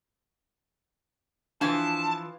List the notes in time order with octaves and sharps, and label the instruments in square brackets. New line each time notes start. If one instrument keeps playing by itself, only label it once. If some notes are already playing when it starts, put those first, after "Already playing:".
[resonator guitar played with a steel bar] E3 F3 [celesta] D4 [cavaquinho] F4 G#5 [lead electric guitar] A5